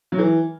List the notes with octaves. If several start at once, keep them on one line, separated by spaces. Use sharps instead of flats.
F#3
E3